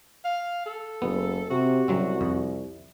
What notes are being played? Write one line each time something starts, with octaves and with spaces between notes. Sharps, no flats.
F5
A4
F#1 B3
C3 F#4
C2 C#3 F#3 C4
F2